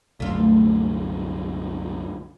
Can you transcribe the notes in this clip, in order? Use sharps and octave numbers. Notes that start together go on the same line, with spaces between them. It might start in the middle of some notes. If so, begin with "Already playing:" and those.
C2 F#2 D3 A3 F4